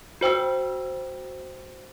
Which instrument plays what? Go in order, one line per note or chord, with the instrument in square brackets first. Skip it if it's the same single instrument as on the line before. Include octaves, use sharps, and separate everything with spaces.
[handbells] F#4 C5 G5 E6